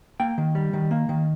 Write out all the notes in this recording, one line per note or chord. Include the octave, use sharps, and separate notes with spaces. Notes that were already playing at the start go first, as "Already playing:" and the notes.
A#3 G5
D#3
G3
D#3
A#3
D#3